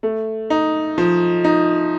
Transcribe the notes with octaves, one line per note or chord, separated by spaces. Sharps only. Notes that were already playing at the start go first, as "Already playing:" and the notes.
A3
D#4
F3
D#4